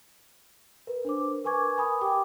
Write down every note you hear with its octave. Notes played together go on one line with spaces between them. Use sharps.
A#4 B4
D4 C5 D6
A#4 B4 G#5 C#6 D6 G#6
G#5 B5 D#6
G4 G5 D6